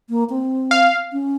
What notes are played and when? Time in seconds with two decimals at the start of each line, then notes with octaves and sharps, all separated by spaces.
0.10 A#3
0.30 C4
0.71 F5
1.13 C#4